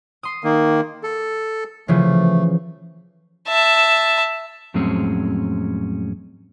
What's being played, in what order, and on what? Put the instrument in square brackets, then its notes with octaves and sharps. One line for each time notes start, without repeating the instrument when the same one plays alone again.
[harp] C6 D#6
[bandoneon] D#3 A#3
A4
[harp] C#3 E3 F3 [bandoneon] A3
[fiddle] E5 A5
[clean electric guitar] F2 A2 F#3 G#3 C4 C#4